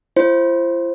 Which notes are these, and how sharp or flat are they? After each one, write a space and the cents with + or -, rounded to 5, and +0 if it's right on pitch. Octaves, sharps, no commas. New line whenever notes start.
F4 -45 C5 +10